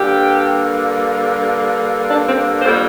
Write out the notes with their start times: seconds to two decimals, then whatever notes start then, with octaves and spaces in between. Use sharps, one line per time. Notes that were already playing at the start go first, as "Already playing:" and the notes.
Already playing: G2 D3 A#3 G4
2.09 D4
2.27 C4
2.62 F2 D3 G3 A#3 C5